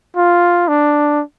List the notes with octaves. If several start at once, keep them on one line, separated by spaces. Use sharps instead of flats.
F4
D4